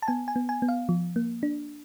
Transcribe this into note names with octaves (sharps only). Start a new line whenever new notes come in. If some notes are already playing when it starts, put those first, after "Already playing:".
A5
B3 G#5
G#5
B3
G#5
B3
F5
F3
A#3
D4